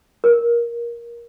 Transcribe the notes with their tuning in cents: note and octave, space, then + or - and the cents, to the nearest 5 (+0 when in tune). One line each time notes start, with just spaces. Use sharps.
A#4 +15